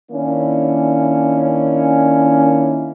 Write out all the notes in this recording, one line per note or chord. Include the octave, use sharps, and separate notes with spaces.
D#3 A#3 C#4 D4 E4